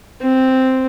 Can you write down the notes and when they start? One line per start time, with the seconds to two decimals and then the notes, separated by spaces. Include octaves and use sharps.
0.22 C4